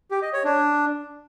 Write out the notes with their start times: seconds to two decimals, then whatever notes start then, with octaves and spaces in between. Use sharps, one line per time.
0.11 G4
0.22 D#5
0.33 C#5
0.44 D4